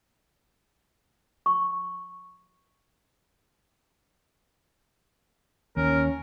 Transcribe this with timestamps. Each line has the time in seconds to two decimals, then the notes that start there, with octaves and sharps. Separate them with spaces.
1.46 C#6
5.77 D#2 C#4 A#4